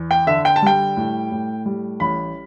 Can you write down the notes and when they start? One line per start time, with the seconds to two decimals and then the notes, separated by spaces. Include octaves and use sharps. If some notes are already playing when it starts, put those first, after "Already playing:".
Already playing: E2
0.11 G5
0.27 D3 E5
0.45 G5
0.56 A5
0.62 G3 G5
0.97 A2
1.32 A2
1.65 G3
2.00 A1 B5